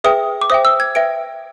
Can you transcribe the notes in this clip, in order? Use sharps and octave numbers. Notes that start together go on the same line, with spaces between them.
G#4 B4 E5 G5 D#6
D6
C5 E5 G5 D#6
E6
G#6
B4 E5 G5 D7